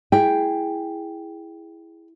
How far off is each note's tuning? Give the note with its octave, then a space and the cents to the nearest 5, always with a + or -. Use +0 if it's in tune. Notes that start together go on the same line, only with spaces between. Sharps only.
E4 +0 G#4 +0 G5 +0